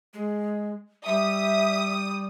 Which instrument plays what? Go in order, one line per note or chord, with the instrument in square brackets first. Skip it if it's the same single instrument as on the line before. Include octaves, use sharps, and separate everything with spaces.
[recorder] G#3
[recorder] G3 [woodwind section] E5 [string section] D#6